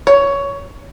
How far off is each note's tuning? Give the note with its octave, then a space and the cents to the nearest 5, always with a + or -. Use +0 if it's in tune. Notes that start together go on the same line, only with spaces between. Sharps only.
C#5 +15